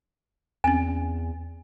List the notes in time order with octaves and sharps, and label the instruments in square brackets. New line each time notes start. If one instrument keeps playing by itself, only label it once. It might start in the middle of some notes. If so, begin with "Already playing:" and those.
[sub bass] E2 [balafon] C4 C#4 [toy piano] G#5